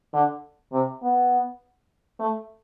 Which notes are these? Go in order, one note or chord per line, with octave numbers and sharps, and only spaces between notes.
D3
C3
B3
A3